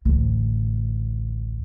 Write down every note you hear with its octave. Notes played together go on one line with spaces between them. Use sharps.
A1 D2